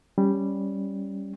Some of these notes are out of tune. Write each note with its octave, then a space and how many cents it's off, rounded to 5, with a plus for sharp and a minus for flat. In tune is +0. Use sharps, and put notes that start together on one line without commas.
G3 +0 C#4 +0